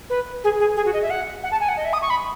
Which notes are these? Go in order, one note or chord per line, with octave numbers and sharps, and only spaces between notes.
B4
G#4
G#4
G#4
F#4
D#5
E5
F#5
F#5
A5
G#5
F#5
D#5
E5
D#6
C#6
B5